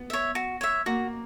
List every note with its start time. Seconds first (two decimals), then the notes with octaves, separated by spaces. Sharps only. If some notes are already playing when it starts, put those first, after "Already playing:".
Already playing: B3
0.10 C#5 E5
0.35 F#4
0.61 C#5 E5
0.86 A#3 F#4